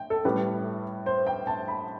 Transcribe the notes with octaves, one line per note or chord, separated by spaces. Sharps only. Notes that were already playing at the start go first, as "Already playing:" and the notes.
Already playing: G5
A4
A2 G3 B4
C5
G5
A5
B5